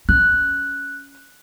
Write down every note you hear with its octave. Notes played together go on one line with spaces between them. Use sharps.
C#4 F#6